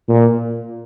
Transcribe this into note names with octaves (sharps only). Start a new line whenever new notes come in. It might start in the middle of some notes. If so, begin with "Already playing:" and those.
A#2